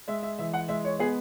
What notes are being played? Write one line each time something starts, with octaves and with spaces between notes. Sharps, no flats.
G#3 E5
E5
E3 E5
F#5
G#3 E5
C#5
B3 G#4